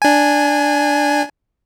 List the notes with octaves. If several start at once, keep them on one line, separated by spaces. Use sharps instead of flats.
D4 G#5